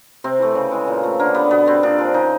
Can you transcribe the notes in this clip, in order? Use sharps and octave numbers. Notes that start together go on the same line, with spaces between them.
C3 C4
E3 A3
C#3
E3 G#3
A#2
F3 A3
D3 A#3
G3 B3
B2 B3
G3 C4
A#2 D4
F3 G#3
C#3 D#4